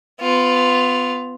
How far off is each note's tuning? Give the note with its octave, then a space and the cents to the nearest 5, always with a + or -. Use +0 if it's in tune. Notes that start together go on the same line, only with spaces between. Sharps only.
B3 +30 F4 +0